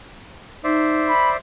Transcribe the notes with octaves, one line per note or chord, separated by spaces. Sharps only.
D#4 C5 D5 E5
B5